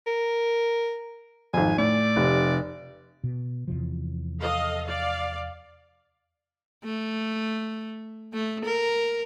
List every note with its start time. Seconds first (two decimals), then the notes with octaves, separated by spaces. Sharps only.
0.06 A#4
1.54 G#1 F2 G#5
1.78 A2 D5
2.16 F1 C3
3.24 B2
3.68 E2 C3 F3
4.39 A4 D#5 F5
4.85 D5 F5
6.85 A3
8.34 A3
8.65 A#4